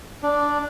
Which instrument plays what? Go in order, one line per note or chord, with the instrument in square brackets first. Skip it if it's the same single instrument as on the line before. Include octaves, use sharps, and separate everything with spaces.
[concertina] D4